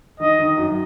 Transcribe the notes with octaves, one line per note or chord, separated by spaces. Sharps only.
D#3 D#5
D#3
F#2